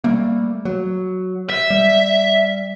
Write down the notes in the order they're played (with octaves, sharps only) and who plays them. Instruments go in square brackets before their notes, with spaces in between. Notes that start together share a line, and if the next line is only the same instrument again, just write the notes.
[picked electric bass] G3 A3 A#3
F#3
[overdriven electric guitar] E5
[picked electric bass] G3